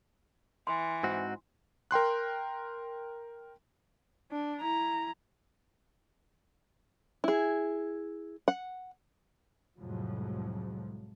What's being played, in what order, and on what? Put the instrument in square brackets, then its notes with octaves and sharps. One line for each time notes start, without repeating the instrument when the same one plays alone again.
[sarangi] E3 [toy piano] C6
[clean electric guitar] G#2 C4 F#4
[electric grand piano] A#4 G5 C6 F#6
[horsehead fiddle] D4
E4 A#5
[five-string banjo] E4 G#4
F#5
[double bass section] C2 F2 A2 F3 F#3 G#3